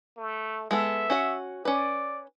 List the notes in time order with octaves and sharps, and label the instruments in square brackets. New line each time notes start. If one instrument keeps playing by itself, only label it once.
[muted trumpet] A3
[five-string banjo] G#3 B3 A4 [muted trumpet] E5
[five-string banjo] C#4 F#4 F#5
[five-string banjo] C#4 B4 [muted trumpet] D5